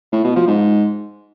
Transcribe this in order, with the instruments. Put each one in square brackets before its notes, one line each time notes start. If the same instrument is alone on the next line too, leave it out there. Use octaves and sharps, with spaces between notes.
[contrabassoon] A2
B2
F3
G#2